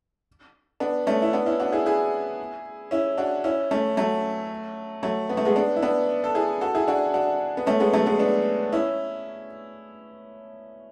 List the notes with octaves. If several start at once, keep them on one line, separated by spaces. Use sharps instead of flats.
B3 D4
A3 C#4
E4
B3 D4
C#4 E4
D4 F#4
E4 G#4
E4 G#4
C#4 E4
D4 F#4
C#4 E4
A3 C#4
F#3 A3
F#3 A3
B3
A3
G#3 B3
B3 D4
E4
B3 D4
A4
E4 G#4
F#4 A4
E4 G#4
D4 F#4
D4 F#4
B3
A3 C#4
G#3 B3
F#3 A3
G#3 B3
B3 D4
C#4 E4